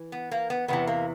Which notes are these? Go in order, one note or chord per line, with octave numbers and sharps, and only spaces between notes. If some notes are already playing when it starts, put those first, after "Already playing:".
Already playing: E3
B3
A#3
B3
E2 C3 E3 B3
A#3